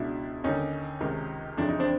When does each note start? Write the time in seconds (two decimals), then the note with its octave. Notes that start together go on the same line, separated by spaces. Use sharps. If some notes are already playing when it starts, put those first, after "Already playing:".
Already playing: C#2 B2 D4 E4
0.44 D#2 D3 C#4 D#4
1.01 C#2 C3 D#3
1.58 F2 C#3 E3 D4
1.69 D#4
1.79 C4 D4